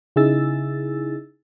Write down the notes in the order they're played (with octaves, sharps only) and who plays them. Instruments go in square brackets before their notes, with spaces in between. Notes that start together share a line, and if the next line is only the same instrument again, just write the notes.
[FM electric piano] C#3 D#4 E4 G#4 E6 A6